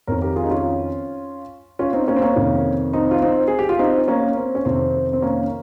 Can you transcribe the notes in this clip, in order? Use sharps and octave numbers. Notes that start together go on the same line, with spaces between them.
F2 D#3 A#4 C#5
G4 A#4
F4 G#4
D#4
C#4 F4
C#4 F4
C4 D#4
A#3 C#4
C4
A#3 C#4
F2 C3 D#3
C4 D#4
F4
C4 D#4
G#4
G4
F4
C4 D#4
A#3 C#4
C4
C#4
F2 C3 D#3 C4
C4
A#3 C#4